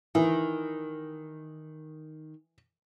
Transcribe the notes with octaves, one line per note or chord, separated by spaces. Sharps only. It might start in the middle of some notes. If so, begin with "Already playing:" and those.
D#3 E3